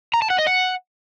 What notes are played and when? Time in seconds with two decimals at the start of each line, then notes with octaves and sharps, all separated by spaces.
0.14 A#5
0.22 A5
0.30 F#5
0.38 D#5
0.47 F#5